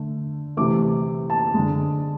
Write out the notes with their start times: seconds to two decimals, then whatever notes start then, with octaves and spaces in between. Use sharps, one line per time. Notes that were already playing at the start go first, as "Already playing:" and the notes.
Already playing: D3 A3
0.57 C3 E3 A3 D6
1.30 A5
1.54 D3 G#3